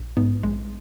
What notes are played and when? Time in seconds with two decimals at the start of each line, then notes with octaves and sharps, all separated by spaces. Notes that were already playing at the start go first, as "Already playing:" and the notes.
Already playing: A#1
0.17 G#2 B3
0.43 A#1 G#3